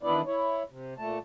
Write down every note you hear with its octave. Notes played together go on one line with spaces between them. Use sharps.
D#2 E3 B3 D4 E4 D5
E4 C#5
C3
A#2 A3 A5